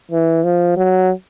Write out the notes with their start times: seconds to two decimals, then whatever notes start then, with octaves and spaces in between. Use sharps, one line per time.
0.11 E3
0.44 F3
0.77 F#3